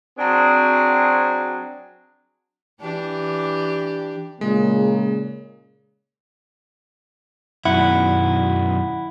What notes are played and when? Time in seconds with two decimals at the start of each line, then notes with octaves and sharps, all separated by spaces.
0.18 F#3 C4 D4 F#4 G#4
2.81 E3 D4 G4
4.41 A#2 C#3 G#3 A#3
7.65 F#2 B2 D#3 E4 F#5